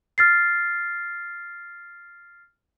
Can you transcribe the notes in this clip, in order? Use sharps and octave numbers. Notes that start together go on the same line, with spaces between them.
F6 A6 C7